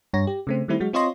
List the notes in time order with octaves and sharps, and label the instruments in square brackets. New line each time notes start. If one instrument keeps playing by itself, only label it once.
[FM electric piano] G2 C#5 A#6
G4
C#3 A3 C4
D#3 G3 A3 C4 E4
F#3 G#3 F#4
C4 F4 C#5 D#5 C6 A#6